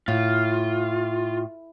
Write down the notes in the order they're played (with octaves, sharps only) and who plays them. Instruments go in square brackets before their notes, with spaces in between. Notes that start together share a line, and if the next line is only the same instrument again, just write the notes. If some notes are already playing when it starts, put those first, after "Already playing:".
[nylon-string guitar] A2 [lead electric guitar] F4